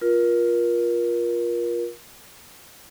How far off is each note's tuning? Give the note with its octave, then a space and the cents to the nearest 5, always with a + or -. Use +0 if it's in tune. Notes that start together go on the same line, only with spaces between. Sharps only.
F4 +5 A#4 +30